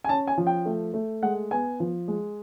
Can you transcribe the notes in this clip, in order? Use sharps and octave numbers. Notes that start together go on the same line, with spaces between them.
G#5
C#4 A5
G#5
F3
G5
A3
A3
G#3 F#5
B3 G#5
F3
G#3